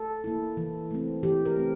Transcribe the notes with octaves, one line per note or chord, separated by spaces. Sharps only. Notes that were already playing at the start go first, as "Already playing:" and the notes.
Already playing: A4
A#3 E4
E3
A3 C4
E3 G4
A#4
A3 C4